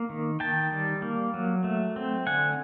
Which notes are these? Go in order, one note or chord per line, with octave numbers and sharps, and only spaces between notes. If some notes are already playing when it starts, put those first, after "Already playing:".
Already playing: A#3
D#3
D#3 G5 A5
G3
A#3
F#3
A3
C4
D3 F#5 G#5